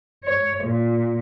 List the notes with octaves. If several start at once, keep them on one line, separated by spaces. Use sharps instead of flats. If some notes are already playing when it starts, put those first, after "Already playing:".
C#5
A#2